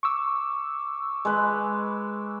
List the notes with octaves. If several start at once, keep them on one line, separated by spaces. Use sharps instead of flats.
C#6 D6 E6
G#3 B4